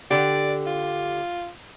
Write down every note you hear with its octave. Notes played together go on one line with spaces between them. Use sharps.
D3 G4 D5
F4